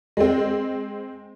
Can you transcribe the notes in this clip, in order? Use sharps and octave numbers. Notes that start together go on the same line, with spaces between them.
G#3 C4